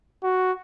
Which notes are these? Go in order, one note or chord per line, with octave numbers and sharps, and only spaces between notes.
F#4